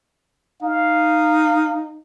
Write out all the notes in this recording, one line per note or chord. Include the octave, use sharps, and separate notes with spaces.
D#4 F5